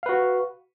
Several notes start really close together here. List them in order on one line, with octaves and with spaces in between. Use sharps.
F5 B4 F#4